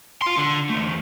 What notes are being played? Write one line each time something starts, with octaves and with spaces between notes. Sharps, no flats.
F4 C6
D3
E2 A3